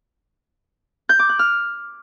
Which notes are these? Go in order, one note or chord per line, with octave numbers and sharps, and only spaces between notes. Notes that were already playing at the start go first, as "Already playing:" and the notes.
G6
D6
F#6
F6